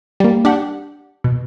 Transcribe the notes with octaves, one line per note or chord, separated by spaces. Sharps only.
G3 A#3
D4 G4 F#5
B2